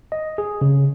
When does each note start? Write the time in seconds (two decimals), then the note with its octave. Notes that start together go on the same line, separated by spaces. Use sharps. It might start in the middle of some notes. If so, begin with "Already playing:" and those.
0.12 D#5
0.38 G#4
0.61 C#3